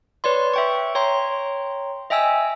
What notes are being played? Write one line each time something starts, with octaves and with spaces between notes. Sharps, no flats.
B4 C#5 D5 C6
E5 G5 C#6
C#5 G5 A#5 C6
D#5 E5 G5 G#5 E6